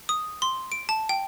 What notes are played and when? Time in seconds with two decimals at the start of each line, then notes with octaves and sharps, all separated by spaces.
0.09 D#6
0.42 C6
0.72 D7
0.89 A5
1.09 G5